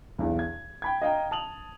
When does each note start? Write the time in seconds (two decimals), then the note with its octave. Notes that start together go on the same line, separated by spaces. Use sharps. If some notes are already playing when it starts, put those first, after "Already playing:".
0.19 B1 E2
0.39 G#6
0.82 G5 B5 G#6
1.02 D#5 F5 G5 A#5
1.31 A5 D#6 F7 F#7